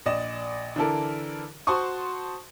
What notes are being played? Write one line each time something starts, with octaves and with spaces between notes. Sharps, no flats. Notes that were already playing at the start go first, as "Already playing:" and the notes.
A#1 D5 D#5 E7
D3 E3 D4 E4 A4 A#4
F#4 C5 A5 C6 C#6 D#6